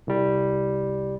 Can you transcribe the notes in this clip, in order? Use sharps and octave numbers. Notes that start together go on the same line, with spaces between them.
C2 G3